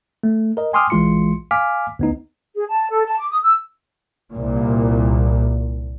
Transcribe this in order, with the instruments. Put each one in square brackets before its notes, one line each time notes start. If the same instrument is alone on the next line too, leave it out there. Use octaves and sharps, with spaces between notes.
[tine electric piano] A3
A#4 D#5
G5 G#5 C6 D6 D#6 F6
A#1 E3 G#3 F4 C6 C#7
F5 G#5 D6 F6 B6
D2 B3 D#4
[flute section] G#4
A5
A4
A5
D6
D#6
E6
[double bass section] C2 A#2